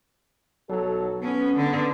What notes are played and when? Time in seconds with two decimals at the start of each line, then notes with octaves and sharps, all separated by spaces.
0.69 B1 F#3 A4
1.22 B3 C#4
1.55 D3